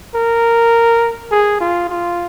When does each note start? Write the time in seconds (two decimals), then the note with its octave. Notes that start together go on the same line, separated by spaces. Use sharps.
0.15 A#4
1.31 G#4
1.60 F4
1.89 F4